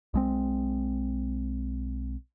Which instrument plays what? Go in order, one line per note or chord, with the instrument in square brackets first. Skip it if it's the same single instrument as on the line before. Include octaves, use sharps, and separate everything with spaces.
[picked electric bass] B1 G#3 C4